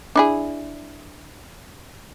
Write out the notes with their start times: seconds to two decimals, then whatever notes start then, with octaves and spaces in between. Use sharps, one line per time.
0.16 D4 E4 G#4